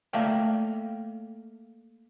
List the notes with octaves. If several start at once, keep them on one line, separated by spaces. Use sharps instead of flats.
A3 A#3 D5 E5 F5 G5